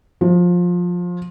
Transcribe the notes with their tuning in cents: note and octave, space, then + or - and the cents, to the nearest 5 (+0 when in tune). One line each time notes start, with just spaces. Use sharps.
F3 +20